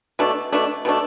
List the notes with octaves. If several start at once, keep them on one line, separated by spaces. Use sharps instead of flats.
B2 A3 D4
B2 A3 D4
B2 A3 D4